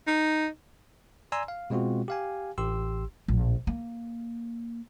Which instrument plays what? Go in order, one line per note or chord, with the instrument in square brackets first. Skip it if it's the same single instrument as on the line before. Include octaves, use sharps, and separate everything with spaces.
[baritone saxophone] D#4
[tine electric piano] D5 G#5 A#5 C6 E6
F5
B2 G#3 C4 F4 F#4
G4 F5 G#5
A1 G4 C6 E6
[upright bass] A#1 A2
A#3